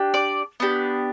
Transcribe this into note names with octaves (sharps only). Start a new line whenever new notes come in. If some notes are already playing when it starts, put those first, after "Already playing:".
Already playing: D4 G4
D5
B3 D4 G4